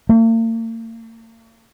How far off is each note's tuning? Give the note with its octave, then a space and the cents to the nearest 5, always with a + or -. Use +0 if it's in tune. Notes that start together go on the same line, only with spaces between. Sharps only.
A#3 -45